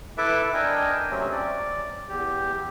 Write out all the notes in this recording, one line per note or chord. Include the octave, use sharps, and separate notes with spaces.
E4 A4 B4 E5 A5 D6
D4 A#4 D#5 G5 G#5
C3 F#3 A3 C4 C#4
D5
E2 G4